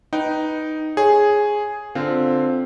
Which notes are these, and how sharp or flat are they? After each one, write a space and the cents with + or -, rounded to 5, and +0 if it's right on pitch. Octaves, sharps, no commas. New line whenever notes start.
D#4 +0 B4 -5 G5 -20
G#4 +0 C#5 -15
D3 +0 C4 +0 F4 +0